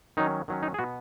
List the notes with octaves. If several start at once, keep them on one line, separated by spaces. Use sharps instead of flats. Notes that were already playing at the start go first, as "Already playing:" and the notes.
D#3 F#3 C#4 D#4
D#3 F#3 C#4
D#4
G#4
B2 B3 F#4